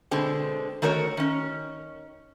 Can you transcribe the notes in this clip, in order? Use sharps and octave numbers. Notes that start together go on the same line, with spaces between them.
B2 D3 G#3 C4
D#3 A3 F#4 A#4 C#5
D#3 C#4